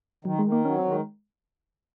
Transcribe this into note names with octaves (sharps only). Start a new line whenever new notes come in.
D#3 F#3
G#3
D#3
A#3
F#3 C#4
C4
D#3
G#3